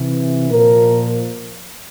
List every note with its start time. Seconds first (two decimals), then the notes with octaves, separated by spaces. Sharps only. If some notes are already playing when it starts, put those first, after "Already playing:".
Already playing: C3 E3
0.50 A#2 F3 A#4